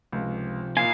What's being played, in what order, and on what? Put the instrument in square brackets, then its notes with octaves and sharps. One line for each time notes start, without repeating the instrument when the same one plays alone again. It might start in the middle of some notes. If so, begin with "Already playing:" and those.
[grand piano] C#2 [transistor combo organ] C3 F3
[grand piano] A#2 [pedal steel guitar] D#4 E4 G#5 [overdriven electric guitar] F5